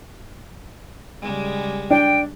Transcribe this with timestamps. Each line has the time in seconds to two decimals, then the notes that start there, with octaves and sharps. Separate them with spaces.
1.21 C#3 G3 G#3
1.90 D4 G5